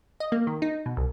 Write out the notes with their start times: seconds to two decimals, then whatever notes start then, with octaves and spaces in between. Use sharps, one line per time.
0.20 D#5
0.32 A#3
0.47 D#3
0.62 D#4
0.86 B2
0.97 C2